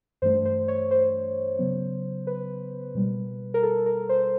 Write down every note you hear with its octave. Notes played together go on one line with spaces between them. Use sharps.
G2 E3 A3 D4 C5
C5
C#5
C5
C#3 F#3 B3
B4
B2 G3 A#3
A#4
A4
A#4
C5